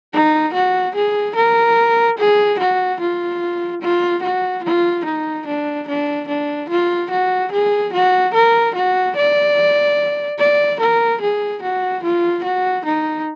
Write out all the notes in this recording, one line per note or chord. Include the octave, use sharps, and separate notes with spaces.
D#4
F#4
G#4
A#4
G#4
F#4
F4
F4
F#4
F4
D#4
D4
D4
D4
F4
F#4
G#4
F#4
A#4
F#4
D5
D5
A#4
G#4
F#4
F4
F#4
D#4